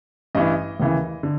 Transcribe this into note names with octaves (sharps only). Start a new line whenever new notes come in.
A1 G2 E3 D#5
D#2 C#3 E3
D3